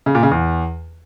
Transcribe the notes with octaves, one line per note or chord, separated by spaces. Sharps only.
C#3
A#2
C#3
E2